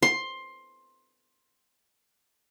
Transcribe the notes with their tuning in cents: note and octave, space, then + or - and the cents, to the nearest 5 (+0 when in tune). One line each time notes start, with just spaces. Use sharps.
C6 +15